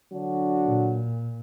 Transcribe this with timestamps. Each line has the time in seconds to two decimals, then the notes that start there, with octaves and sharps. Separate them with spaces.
0.12 D3 F#3 D4 F#4
0.66 A#2